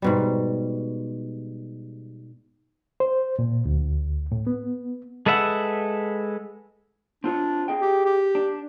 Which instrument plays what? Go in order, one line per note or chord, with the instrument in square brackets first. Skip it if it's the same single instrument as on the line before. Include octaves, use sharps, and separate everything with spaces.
[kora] G#2 B2 G3
[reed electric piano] C5
A#2
D2
A2
B3
[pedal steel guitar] G#3 A4 B4 E5 F#5
[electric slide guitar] C4 F4 C#5 [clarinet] D4
[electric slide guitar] G#4 D#5 G5
[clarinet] G4
G4
[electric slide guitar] D4